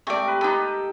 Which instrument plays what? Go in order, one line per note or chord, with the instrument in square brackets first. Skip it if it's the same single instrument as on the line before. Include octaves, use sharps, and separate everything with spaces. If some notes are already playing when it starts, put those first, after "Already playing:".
[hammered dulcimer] C3 G#3 A3 [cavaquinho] D5 C#6
[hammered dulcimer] A#4 B4
[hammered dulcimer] B3 G4 B4 [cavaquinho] D#4 A4
[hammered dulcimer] A#4